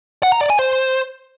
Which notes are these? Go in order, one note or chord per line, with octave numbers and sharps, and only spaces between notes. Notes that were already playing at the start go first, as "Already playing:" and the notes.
F#5
A#5
D5
G#5
C5